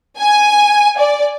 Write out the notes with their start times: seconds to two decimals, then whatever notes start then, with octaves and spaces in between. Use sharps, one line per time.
0.18 G#5
0.97 D5